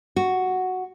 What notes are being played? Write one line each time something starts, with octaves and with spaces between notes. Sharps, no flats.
F#4